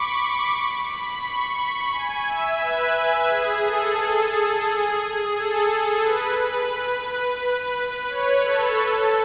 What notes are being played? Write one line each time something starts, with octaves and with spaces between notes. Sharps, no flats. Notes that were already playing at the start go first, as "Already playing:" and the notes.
Already playing: B5 C#6 D6
C#6
B5
C#6
B5
G#5
E5
B4
G#4
A4
G#4
A4
B4
B4
C#5
A4
A4